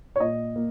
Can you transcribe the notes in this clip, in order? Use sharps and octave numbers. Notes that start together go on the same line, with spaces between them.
C#5
A#2 D#5
A#3